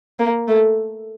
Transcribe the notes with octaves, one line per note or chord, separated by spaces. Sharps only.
A#3
A3